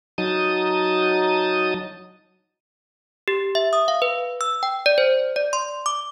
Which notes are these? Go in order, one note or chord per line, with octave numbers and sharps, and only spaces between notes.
F#3 D#4 A5 D#6
G4
E5
D#6
F5
B4
E6
G5
D5
C5
D5
C6
D6